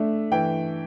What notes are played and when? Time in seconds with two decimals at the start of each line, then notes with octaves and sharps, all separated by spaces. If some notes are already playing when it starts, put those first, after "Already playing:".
Already playing: A3 D4 E5
0.32 E3 G5